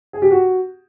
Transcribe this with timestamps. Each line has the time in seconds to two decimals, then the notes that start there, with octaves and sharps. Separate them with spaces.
0.13 G#4
0.22 G4
0.31 F#4